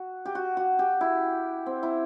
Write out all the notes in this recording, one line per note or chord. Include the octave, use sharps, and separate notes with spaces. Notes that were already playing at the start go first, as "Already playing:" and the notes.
Already playing: F#4
G4
F#4
F#4
G4
E4
C4
E4